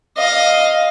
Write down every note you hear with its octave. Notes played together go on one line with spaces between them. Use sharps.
D#5 F5